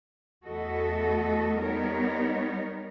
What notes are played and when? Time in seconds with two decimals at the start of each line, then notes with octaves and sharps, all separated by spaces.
0.46 E2 A3 E4 F#4 A4 D#5
1.59 G3 B3 D#4 A#4 C#5